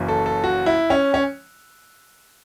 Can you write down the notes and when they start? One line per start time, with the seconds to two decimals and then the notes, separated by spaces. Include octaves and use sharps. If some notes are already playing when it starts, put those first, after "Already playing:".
Already playing: F#1 F#2 E3
0.08 A4
0.26 A4
0.44 F#4
0.66 E4
0.90 C#4
1.14 C#4